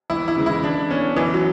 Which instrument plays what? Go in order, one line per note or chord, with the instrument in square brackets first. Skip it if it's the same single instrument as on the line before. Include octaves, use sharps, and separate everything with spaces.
[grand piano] E2 [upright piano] E4
[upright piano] E4
[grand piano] C#3 E3 G#3
[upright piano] E4
[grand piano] E3 [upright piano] D4
[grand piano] B3 D4 [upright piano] C#4
[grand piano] F#2 [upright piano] E3
[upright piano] F#3